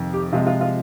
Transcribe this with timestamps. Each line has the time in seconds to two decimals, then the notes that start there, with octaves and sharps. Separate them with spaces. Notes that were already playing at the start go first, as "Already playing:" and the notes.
Already playing: F2 C3 D#3
0.13 G4
0.33 C3 F3 G#3 F4
0.47 F4
0.61 F4